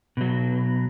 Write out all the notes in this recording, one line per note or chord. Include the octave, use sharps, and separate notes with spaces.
B2 F#3